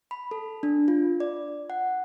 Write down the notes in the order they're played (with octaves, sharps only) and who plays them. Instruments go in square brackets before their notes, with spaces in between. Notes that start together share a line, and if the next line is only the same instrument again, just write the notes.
[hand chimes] B5
A4
D4
F4
D5
F#5